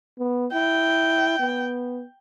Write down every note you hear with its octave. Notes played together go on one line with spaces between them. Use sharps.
B3
E4 G5
B3